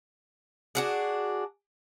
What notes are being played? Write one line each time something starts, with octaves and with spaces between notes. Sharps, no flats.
D4 F#4 G#4